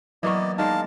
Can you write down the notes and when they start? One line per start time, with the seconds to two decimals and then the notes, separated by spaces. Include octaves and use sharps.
0.23 E3 F#3 A#3 B3 D5 D#5 C#6
0.58 D#3 G#3 D5 F5 A5